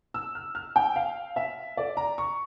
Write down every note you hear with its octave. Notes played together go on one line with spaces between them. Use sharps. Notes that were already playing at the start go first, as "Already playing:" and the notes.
E6
F6
F6
G5
F5
E5
D5
A#5
C#6